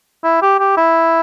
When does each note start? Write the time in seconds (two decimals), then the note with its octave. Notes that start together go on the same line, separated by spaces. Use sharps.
0.24 E4
0.42 G4
0.59 G4
0.77 E4